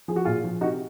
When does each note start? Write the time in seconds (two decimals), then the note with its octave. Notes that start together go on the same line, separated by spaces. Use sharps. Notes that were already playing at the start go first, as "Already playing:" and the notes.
0.08 F3 G#4
0.16 F#4
0.25 A#2 F4 G#4
0.44 F3
0.61 C3 D#4 F#4